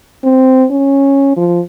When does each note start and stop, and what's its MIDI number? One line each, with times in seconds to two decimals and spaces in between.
0.24 0.65 60
0.71 1.34 61
1.37 1.60 53